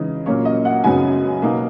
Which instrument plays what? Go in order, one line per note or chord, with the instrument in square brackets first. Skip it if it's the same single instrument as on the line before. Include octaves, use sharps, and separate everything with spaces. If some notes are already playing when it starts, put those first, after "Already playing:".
Already playing: [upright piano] C#3 E3 G#3 D#4
A#2 F#3 A#3 C#4 C#5
D#5
F#5
F#2 C#3 F#3 B3 D#4 G#5
B2 A#3 D#4